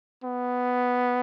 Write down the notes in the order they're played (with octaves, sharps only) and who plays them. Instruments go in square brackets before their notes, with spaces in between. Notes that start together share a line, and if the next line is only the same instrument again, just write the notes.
[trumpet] B3